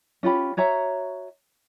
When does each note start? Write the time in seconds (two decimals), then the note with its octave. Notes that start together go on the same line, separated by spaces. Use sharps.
0.23 C#4 F4 G4 B5
0.57 F#4 C#5 E5 A#5